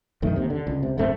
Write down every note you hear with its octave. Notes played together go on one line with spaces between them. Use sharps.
E1 F#2 D#3 A3
D#2 C3
D3
C#2
C3
D1 G2 A3 C4